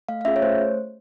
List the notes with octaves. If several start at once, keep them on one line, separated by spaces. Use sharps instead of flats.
A3 F5
F5
C#4 F4 G#4 E5
C#5
A3 C5